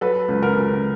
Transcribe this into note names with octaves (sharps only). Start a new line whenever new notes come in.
F#3 A4 B4
C#2
A#4
C#2